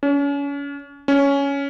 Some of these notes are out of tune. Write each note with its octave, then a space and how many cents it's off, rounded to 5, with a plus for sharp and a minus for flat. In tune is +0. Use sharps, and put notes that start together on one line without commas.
C#4 +35
C#4 +10